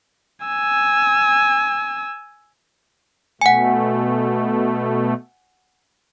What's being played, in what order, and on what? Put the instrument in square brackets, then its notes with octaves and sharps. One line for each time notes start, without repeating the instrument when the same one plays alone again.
[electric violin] G#5 E6
[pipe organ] B2 A3 [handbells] F#5 G#5